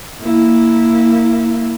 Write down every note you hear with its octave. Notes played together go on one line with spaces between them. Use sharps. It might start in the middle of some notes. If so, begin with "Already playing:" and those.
A#3 E4